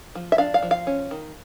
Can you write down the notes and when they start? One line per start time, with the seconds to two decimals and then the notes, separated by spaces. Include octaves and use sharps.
0.15 F3
0.32 E5
0.38 D4 F5
0.54 F5
0.63 F3
0.71 F5
0.87 C#4
1.11 D#3